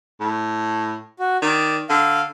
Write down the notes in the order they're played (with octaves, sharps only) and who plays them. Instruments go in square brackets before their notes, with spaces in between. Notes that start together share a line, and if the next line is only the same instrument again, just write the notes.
[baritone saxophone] A2
[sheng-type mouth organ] F#4
[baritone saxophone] D#3 [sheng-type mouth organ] D5
[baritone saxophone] D3 [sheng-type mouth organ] F5